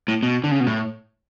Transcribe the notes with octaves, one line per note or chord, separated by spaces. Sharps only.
A2
B2
D3
C#3
B2
A2